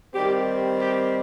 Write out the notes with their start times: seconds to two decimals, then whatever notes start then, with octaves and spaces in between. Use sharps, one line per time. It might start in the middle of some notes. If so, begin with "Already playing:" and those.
0.14 D#3 G3 C4 G4
0.80 G4